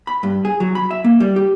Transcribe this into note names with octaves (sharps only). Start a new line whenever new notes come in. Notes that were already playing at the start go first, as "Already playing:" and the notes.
B5
G2
G#4
F#3
B5
E5
A#3
G3
G4